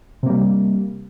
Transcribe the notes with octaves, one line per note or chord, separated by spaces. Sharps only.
C3 G3 A#3